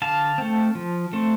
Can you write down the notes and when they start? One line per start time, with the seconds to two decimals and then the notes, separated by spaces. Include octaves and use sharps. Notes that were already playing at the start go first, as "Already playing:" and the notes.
0.02 D3 F5 A5
0.38 A3 C4
0.75 F3
1.13 A3 C4